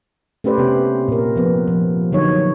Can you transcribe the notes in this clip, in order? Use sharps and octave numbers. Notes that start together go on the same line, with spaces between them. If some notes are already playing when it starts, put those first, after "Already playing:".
A3 C#4 G4 B4 C5 D5
C3 B3 G4
A#2 A#4
F3 B3
F3
D3 F#3 D#4 C#5